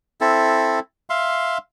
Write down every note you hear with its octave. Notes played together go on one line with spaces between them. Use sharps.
C4 E4 A4
E5 F5 C6